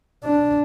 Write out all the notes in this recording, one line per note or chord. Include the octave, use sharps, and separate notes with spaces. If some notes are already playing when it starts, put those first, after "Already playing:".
D4